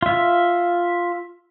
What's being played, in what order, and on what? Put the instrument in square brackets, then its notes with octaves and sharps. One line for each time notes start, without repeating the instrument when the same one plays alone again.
[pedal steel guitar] F4 E5